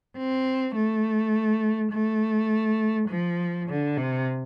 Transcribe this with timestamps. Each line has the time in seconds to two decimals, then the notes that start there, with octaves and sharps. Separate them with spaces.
0.17 C4
0.75 A3
1.92 A3
3.09 F3
3.69 D3
3.97 C3